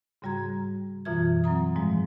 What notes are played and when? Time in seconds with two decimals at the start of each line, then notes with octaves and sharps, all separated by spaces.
0.22 G#2 C#3 G3 F#4 A#5 G#6
1.05 F#2 B2 E3 F4 E5 G#6
1.44 F#3 C4 A#5 D#6
1.76 G#2 F3 G3 G#3